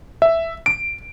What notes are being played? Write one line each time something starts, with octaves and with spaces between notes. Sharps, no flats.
E5
D7